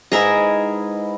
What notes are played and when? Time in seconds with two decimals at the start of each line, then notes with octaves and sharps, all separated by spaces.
0.12 G#2 E4 G#4 A#4 B4 E5